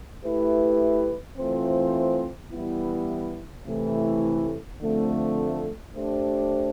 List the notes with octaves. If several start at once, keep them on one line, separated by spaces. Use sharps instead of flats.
A3 E4 G4 B4
E3 A3 C4 F4 C5
E3 G3 B3 E4
C3 E3 A3 E4
D3 F3 A3 C4
A3 D4 G4 C5